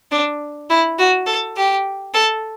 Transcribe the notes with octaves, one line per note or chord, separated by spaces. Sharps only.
D4
E4
F#4
A4
G4
A4